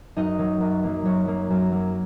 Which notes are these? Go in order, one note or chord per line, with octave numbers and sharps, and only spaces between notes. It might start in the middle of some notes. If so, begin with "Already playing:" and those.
F#2 D#4 D#5
F#3 A#3
F#2
F#3 A#3
F#2 C#5
F#3 A#3
F#2
F#3 A#3